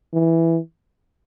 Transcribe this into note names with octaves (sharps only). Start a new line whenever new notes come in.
E3